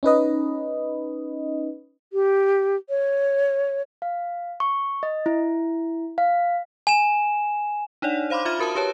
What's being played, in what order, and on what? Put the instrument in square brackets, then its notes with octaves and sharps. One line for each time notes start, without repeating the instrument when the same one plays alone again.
[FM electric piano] C#4 D#4 B4 D#5
[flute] G4
C#5
[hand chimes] F5
C#6
D#5
E4
F5
[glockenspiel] G#5 E7
[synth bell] D4 D#4 C#5 D5 F#5
C5 F5 B5 C6 D6
F4 E5 B5 F6 D#7 E7
F#4 A#4 A5 D#6
G4 B4 C#5 A5